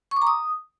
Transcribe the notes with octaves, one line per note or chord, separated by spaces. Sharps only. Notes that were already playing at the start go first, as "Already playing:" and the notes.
C#6
D6
A#5
D#6